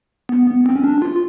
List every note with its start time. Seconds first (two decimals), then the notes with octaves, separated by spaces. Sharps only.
0.29 B3
0.47 B3
0.66 C4
0.76 C#4
0.84 D4
1.02 F4